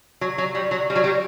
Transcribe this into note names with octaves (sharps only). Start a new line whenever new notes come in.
F#3
F#3
G3
F#3
G3
F#3
G3